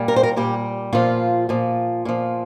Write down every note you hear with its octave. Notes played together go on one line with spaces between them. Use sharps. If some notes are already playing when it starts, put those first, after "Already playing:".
Already playing: A#2 G3
A#4
C5
A#4
A#2 G3 G4
A#2 F3 F4
A#2 F3
A#2 F3